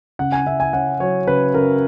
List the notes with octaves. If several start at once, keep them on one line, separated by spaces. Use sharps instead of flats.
C#3 F#5
G#5
C#3 E5
G#5
C#4 F#5
F#3 C#5
C#3 B4
C#3 A#4